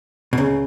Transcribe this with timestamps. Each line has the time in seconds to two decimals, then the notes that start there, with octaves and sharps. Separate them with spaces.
0.33 B2
0.37 C#2 C#3